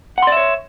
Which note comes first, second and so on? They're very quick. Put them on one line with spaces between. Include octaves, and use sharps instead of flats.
F#5 C6 D5 E5 C#5